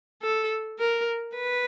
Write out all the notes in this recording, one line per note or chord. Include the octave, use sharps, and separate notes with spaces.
A4
A#4
B4